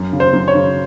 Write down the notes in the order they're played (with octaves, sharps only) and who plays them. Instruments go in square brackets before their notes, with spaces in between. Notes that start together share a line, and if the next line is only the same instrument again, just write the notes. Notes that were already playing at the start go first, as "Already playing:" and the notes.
Already playing: [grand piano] F#2
C#3
C5
F#2
C#5
C#3